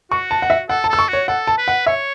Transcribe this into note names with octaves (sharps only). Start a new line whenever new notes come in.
F#4 C#6
A5
F#5
E5
A4 F#5
A5
A4 E6
C#6
F#4 C#5
A4 F#5
A5
B4
F#5
C#5 E5